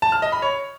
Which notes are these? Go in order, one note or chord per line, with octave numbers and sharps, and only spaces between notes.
A5
F6
D#5
B5
C#5